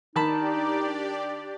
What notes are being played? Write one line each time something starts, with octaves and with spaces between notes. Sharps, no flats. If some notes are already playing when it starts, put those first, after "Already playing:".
D#3 D4 D#4 G4 D5 A5 B5